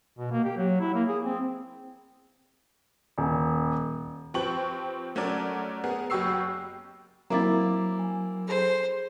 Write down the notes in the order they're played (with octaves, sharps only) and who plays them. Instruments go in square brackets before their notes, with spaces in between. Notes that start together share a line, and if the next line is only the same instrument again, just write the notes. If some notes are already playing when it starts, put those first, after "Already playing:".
[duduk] B2
A#3
G4
F#3
E4
A#3
G#4
C4
[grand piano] D#1
[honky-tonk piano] F3 C4 G4 B4 C#6 F#7
F#3 A3 C#4 F#4 A#4 D5
B3 G#4 A#4
F#1 F#3 G4 C#6 E6 C7
[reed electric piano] F#3 [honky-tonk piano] A#3 C4 E4 [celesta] A#5 D6 A6
[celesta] G#5
[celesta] G#4 A4 [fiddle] C5